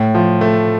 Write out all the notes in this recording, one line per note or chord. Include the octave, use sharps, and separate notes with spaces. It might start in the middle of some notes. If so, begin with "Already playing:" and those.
Already playing: A2
F3
A3